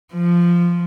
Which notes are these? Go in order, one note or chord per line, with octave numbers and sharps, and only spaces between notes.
F3